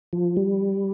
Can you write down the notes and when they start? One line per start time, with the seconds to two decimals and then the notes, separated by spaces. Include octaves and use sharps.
0.13 F3
0.37 G3